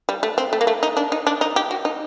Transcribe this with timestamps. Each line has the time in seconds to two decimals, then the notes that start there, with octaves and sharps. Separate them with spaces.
0.09 G3
0.23 A3
0.38 C4
0.53 A3
0.61 A#3
0.67 A3
0.83 D#4
0.97 D4
1.12 D#4
1.27 D4
1.41 D#4
1.56 G4
1.71 F#4
1.85 D#4